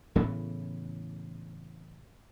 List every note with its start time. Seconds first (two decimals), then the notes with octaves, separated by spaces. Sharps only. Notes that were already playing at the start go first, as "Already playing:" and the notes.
0.15 A2 C#3 E3 B3